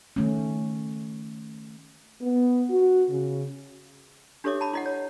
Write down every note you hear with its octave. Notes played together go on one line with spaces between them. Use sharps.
D#3 A3 C#4
B3
F#4
C#3
D4 G4 A4 C#5 E5 D6
A5 B5
E4 D#5 F#5
C#5